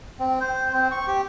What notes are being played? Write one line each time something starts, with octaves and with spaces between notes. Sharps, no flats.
C4
C5
C4
C#6
G4